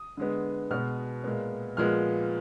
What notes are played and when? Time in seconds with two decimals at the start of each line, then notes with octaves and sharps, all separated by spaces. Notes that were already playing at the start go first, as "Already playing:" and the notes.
Already playing: D#6
0.17 D3 G#3 B3
0.71 B2 G#3 B3 F6
1.24 A#2 G#3 B3
1.77 A#2 F3 G#3 B3 F6